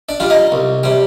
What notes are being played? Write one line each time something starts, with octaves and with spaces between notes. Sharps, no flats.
D4 D5
G3 D4 F4
D#4 D#5
C2
C3 G3